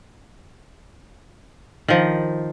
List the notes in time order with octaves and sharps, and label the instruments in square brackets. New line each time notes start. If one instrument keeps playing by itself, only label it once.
[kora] D#3 F3